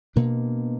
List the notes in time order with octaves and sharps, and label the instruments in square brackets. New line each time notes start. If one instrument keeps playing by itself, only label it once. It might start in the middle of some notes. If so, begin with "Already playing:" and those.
[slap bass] B2 A#3 D4